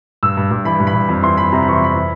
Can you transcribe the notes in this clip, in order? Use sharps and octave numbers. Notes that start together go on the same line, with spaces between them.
G2 E6
G2
G2
E3 B5
G2
B5
G2
F2
E3 C6
E3 B5
C3 A#5
B5
E3 C#6
C6
F2 B5
E3